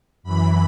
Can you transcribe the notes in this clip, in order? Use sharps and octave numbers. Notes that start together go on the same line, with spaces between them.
F#2 E3 B5